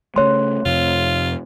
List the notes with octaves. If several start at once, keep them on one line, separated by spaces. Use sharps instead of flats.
C#3 A3 C#5 C6
F2 C3 F4